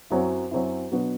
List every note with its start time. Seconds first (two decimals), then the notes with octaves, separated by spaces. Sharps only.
0.10 F#2 F#3 C4 E4
0.51 F#2 F#3 C4 E4
0.91 B2 F#3 B3 D4 F#4